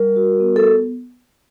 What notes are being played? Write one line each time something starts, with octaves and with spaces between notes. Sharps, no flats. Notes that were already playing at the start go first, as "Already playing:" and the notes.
Already playing: G3 A#4
F#4
B3
A4